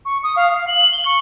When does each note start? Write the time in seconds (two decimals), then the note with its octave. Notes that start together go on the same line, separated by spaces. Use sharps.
0.05 C#6
0.23 D#6
0.36 F5
0.52 F5
0.67 F#7
0.92 G7
1.05 C#6